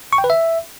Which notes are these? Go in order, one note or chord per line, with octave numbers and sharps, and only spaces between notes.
C#6
G5
B4
E5